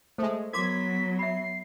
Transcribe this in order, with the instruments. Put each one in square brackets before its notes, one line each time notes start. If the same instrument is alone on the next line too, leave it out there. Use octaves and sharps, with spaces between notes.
[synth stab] G#3 A3 [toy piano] A4 C5
[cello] F#3 B3 [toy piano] A#4 C6 D6 [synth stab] G#6 [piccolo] B6
[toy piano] E5 B5 [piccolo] C7